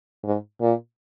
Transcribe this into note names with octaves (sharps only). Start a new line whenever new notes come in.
G#2
A#2